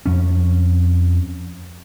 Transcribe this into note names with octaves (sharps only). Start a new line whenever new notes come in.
F2 C#4